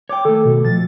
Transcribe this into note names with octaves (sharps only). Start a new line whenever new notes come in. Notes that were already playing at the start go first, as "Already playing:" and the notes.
C#5 G5 D6
D#3 A3 A4
B2
F3 A6